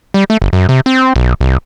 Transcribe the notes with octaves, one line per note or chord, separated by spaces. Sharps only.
G3
A3
G1
F#2
C3
C4
B1
C2